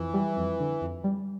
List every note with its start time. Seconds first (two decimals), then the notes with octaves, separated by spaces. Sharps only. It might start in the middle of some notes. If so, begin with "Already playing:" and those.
Already playing: F2 E3
0.14 G3
0.37 F2
0.60 D3
0.81 F2
1.04 G3